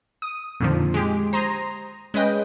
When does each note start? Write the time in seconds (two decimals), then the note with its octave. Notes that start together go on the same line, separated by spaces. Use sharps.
0.22 D#6
0.60 F2 A#2 D3 D#3 F3
0.94 G#3 G4
1.33 C5 A#5 C6 D#6 G#6
2.14 G#3 C#4 B4 D#5 G5